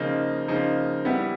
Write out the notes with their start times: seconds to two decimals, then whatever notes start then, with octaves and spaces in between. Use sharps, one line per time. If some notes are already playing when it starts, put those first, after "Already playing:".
Already playing: C#3 F3 A#3 D#4
0.48 C#3 F3 A#3 D#4
1.05 G3 B3 E4 G4